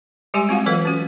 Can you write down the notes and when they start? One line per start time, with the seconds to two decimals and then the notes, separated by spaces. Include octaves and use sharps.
0.34 G3 G#3 G4 G#5 C6
0.49 C4 F4 F#4 F5 F#5
0.66 E3 F#3 A4 B4
0.85 C#4 F#4